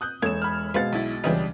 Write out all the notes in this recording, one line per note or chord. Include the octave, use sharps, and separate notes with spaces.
D#6 F#6 G6
E1 A#3 A4 C#5 G#6 E7
B5 F6
B2 G#3 B4 C5 F5 F#5 A6
B1 E4
C#2 C#3 E3 G3 D4 D#4